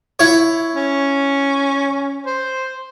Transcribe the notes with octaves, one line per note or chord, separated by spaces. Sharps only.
E4 C#5
C#4
C5